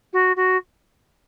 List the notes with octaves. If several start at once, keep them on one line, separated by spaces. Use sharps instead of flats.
F#4
F#4